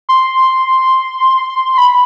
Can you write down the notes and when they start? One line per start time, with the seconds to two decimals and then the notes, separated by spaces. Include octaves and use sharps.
0.09 C6
1.78 B5